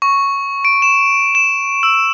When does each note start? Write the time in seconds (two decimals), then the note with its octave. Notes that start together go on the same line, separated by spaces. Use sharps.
0.02 C#6
0.65 D7
0.82 E7
1.35 E7
1.83 E6